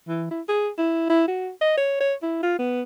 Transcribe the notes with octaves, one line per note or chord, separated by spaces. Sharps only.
E3
E4
G#4
E4
E4
F#4
D#5
C#5
C#5
E4
F4
B3